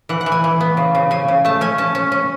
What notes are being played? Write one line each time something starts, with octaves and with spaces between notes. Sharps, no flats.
E3 F#5
F#5
E3
G#5
E3
B3
C#3
C#3
C#3 G#5
C#3
A3 A5
C#4 G#5
C#4 A5
C#4
C#4